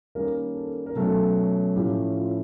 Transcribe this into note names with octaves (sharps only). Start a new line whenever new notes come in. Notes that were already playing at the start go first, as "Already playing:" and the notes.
D#3 G3 A#3 C#4 A#4
A4
A#4
B2 F#3 A3 C#4 A4
A2 F3 A3 C#4 G4
F4